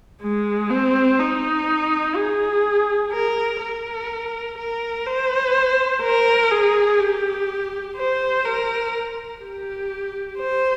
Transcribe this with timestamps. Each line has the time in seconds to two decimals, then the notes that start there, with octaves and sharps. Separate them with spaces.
0.22 G#3
0.70 C4
1.19 D#4
2.16 G#4
3.12 A#4
3.61 A#4
4.58 A#4
5.06 C5
6.02 A#4
6.51 G#4
7.00 G4
7.97 C5
8.45 A#4
9.42 G4
10.38 C5